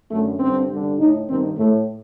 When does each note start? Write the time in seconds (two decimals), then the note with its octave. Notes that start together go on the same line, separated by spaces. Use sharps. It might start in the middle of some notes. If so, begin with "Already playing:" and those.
0.11 F#2 D3 A3
0.40 G2 D3 C4
0.70 G2 D3
0.99 A2 D#4
1.28 G2 D#3 C4
1.57 A2 A3